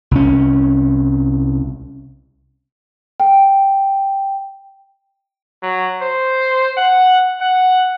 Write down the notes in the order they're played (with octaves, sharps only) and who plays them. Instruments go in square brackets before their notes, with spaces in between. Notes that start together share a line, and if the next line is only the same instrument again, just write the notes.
[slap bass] C2 C#4
[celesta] G5
[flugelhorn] F#3
C5
F#5
F#5